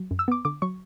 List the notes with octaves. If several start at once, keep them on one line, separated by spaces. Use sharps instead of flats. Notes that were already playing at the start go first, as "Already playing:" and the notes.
Already playing: F#3
F#2
E6
B3 D6
D3 D6
F#3 C#6